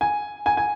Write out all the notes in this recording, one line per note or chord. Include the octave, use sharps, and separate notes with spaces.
G#5
G#5
G#5